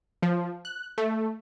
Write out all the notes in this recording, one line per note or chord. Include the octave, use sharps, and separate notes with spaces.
F3
F#6
A3